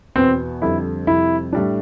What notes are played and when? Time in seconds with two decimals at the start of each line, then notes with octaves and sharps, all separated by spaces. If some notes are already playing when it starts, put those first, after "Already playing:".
0.16 E2 B2 B3 C4
0.62 F2 D3 G3 E4
1.07 F2 C3 G3 E4
1.53 A2 G3 D4